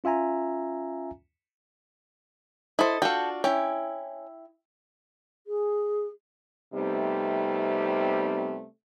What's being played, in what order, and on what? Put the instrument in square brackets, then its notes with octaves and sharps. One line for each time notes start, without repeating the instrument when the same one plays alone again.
[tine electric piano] C#4 F4 E5 G#5 A#5
[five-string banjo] E4 C5 [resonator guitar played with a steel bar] A4 D#5
[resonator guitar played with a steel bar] D4 F4 F#4 [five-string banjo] A4 G5
[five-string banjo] C#4 [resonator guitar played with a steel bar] E4 G5
[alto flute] G#4
[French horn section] C3 G3 A3 B3 C4 D#4